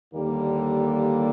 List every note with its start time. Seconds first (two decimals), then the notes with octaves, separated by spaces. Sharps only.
0.13 D#2 D3 G3 A#3